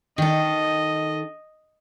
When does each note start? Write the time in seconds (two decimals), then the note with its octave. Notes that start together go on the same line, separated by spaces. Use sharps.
0.18 D#3 A4 D#5